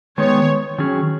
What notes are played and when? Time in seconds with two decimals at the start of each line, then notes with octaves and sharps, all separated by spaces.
0.18 D#3 G#3 B3 C#5
0.78 D#3 F#3 C#4 G#4